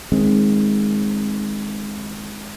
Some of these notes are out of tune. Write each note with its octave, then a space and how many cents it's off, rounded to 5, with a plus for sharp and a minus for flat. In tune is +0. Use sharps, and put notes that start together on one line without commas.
D#3 +0 G#3 +0 C4 +20